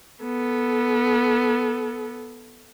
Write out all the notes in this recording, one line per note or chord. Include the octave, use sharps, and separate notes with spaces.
B3 A4